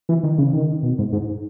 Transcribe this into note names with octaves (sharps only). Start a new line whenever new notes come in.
E3
D#3
C#3
D#3
B2
G#2
G#2